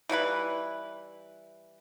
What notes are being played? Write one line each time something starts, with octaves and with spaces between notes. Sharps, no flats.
E3 G3 E4 B4